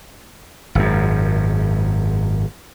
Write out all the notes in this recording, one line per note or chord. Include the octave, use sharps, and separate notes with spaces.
G#1 F#2